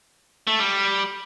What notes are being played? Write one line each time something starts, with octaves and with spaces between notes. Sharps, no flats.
A3
G3